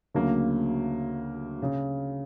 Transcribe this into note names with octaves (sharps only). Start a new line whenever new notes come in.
D2 C#3 F#3 A#3
C#3